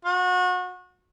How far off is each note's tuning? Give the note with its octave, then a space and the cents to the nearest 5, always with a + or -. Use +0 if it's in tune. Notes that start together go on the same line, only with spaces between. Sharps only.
F#4 -30